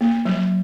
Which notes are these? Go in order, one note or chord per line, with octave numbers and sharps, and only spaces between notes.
A#3
F#3